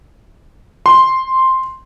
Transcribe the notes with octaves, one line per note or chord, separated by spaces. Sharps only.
C6